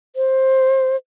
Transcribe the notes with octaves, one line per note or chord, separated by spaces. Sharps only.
C5